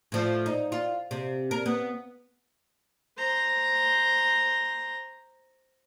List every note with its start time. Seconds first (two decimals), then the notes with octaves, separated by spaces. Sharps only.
0.12 A2 F3
0.46 D#4
0.72 F4
1.11 C3
1.51 A#4
1.66 B3
3.18 C5 A#5